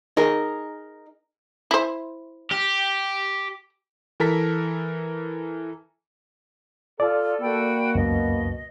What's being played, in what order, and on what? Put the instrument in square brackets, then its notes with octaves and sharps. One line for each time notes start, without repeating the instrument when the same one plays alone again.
[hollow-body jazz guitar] D#4 G#4 A#4
[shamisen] E4 C5
[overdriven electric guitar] G4
[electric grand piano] E3 A4 A#4 A5 A#5 B6
[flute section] F4 [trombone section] A4 [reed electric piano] D5
[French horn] A#3 [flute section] F#4 G5 B5
[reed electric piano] C#2 F#2 [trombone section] B2 [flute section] D#5